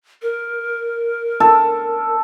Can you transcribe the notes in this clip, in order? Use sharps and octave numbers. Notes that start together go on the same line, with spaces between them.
A#4
A4